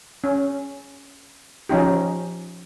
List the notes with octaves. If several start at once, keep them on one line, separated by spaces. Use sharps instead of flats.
C#4
F3 C#4 D#4 G4